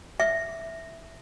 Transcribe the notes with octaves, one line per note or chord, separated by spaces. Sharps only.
E5